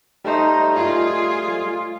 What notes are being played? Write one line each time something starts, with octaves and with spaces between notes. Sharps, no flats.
G3 A3 D#4 C5
F4 G#4